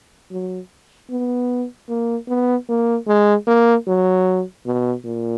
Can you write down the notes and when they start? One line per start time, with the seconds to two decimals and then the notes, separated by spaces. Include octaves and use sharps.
0.31 F#3
1.10 B3
1.89 A#3
2.28 B3
2.69 A#3
3.07 G#3
3.47 A#3
3.87 F#3
4.66 B2
5.05 A#2